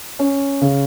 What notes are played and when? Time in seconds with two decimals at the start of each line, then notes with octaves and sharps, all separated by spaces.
0.19 C#4
0.61 C#3